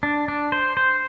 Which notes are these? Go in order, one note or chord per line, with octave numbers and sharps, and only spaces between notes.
D4
D4
C5
C5